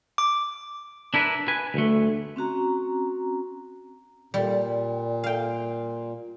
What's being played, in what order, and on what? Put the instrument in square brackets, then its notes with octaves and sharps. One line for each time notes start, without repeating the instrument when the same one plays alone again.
[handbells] D6
[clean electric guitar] D4 E4 A#4 B4
B4 G#5
D2 A3
[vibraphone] C4 C#4 F#4 A#5
[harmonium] A#2 [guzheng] G3
[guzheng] F5 G5